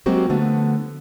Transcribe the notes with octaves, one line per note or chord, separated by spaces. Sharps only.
F#3 G#3 A#3 C4 F#4 G4
D3 F3 A3 B3